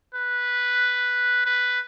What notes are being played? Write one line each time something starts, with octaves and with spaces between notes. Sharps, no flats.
B4
B4